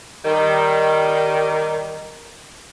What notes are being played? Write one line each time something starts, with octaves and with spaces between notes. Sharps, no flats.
D#3 G3